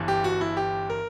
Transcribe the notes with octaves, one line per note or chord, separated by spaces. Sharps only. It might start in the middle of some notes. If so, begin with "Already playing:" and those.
Already playing: G1 G2 E3
G4
F#4
E4
G4
A#4